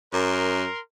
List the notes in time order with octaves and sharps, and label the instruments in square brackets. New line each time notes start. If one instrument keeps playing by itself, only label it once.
[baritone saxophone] F#2 [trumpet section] A#4 C6